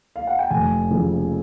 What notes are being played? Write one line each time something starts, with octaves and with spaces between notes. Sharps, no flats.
F5
F#5
G5
F1 G#5
F2 C#3 F3